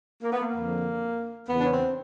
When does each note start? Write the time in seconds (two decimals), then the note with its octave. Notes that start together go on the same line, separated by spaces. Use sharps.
0.22 A#3
0.32 B3
0.42 A#3
0.54 F2 D3 F3
1.49 E2 C#3 E3 B3
1.57 D4
1.65 C#4
1.73 C4